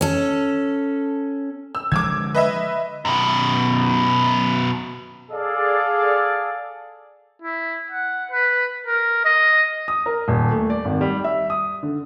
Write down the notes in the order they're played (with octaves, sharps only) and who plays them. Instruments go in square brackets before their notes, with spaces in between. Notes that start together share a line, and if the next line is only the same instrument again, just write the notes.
[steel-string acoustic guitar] C#4 A4
[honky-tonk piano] E6
[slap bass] D3 F3 G#3 [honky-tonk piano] D6 E6 G#6
[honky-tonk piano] B4 D#5 E5
[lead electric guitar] F#2 B2
[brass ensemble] G#4 A4 D5 F5
[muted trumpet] E4
F#5
B4
A#4
D#5
[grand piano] D#6
A#4
D#1
A3
D5
G#1
G3
E5
D#6
D3